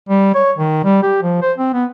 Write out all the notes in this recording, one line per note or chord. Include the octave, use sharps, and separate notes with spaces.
G3
C#5
D#3
G3
G4
F3
C5
C4
B3